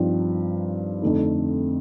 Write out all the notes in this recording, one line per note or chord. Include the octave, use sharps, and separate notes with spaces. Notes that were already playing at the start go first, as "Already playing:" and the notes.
Already playing: G2 F3 C4 D#4
F2 D3 A3 D#4